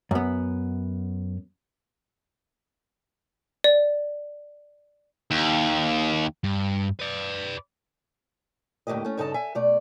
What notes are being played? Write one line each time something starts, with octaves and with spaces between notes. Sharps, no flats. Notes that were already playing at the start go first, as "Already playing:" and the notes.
F#2 B3
D5
D#2
G2
B4 D5
D2 A2 F#3 A#3 G4 D#5
A3 C#4
G2 C#3 D#4 A4 D#5 A5
E5 G#5
B2 A3 D5